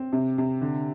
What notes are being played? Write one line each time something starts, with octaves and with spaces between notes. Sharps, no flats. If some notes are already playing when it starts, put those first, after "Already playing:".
Already playing: C4
C3
C3
D3